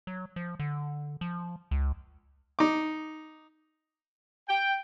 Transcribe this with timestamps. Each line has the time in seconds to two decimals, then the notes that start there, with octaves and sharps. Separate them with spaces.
0.07 F#3
0.36 F3
0.59 D3
1.21 F3
1.71 C#2
2.59 D#4 D6
4.48 G5